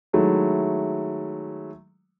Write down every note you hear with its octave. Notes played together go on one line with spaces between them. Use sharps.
D#3 F#3 G#3 A3 E4